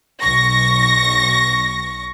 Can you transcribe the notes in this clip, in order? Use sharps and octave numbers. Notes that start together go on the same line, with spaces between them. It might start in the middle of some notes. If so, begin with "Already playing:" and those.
B1 C#6 A#6